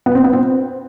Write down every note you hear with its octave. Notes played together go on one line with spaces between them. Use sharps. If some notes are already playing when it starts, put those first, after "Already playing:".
B3
C4
B3
C4